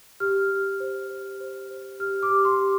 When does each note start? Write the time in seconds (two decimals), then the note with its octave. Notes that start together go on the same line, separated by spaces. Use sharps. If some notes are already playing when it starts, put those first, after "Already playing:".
0.20 G4 F6
0.50 G4
0.80 C5
1.10 C5
1.40 C5
1.70 C5
2.00 G4 F6
2.23 D6
2.30 G4
2.45 C6
2.60 G4